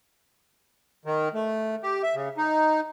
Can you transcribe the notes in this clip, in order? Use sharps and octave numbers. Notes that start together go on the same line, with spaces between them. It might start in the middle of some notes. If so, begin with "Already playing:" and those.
D#3
A3
G4
E5
C#3
D#4